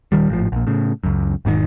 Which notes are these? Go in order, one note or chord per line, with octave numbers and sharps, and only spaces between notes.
D#1 G#1 D#3 G3
G#1 A2 F3
A#1 A#2
A2 C#3
C#2 F#2
E1 G#2 B2 D#3